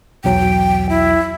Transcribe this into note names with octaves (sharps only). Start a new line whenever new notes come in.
B1 E2 F#3 G5
E4